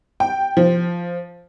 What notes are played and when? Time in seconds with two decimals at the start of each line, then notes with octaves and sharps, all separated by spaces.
0.20 G5
0.57 F3